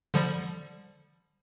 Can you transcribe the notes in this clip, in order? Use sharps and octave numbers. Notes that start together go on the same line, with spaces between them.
D3 F3 G3